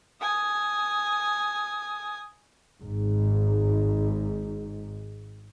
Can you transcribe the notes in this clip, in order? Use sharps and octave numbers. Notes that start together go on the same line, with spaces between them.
G#5 D#6
G#1 G#2